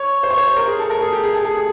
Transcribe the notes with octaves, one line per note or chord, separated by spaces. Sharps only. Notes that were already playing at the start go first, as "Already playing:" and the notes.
Already playing: C#5
C5
C#5
C5
A#4
G#4
A4
A#4
G#4
G4
G#4
A4
G#4
G#4